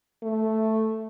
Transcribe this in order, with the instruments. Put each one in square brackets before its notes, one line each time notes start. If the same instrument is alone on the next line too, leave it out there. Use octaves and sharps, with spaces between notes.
[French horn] A3